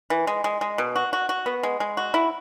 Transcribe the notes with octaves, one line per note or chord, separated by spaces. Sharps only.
E3
G#3
G#3
G#3
B2
F#4
F#4
F#4
B3
G#3
G#3
F#4
E4